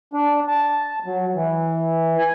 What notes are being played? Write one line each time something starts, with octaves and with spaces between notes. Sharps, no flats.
D4
A5
F#3
E3
G#5